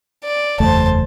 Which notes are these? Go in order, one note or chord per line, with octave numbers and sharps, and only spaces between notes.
D5
F#1 E2 A3 C5 A5